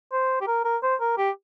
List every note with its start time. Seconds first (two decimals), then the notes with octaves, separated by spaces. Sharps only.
0.12 C5
0.41 G4
0.47 A#4
0.65 A#4
0.83 C5
1.00 A#4
1.18 G4